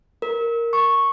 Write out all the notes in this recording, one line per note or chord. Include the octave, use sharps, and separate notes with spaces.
A#4
C#6